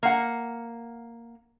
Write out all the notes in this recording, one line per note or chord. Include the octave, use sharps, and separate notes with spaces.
A#3 F#5